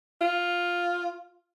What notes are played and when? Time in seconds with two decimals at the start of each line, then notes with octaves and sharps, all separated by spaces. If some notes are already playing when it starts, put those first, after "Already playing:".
0.21 F4